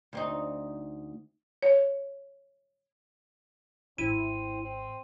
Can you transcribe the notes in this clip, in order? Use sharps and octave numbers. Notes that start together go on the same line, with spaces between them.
D2 C4 D#4
C#5
G#1 C4 E4 D#7
C4